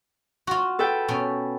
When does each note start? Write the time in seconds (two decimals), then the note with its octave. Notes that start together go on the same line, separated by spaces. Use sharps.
0.47 F4 F#4
0.79 A4 B4 G5
1.08 B2 C#4